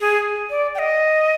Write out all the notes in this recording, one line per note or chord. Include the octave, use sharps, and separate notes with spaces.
G#4
D5
G5
D#5